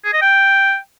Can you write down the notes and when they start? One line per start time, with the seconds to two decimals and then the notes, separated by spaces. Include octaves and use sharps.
0.04 G#4
0.13 D#5
0.22 G5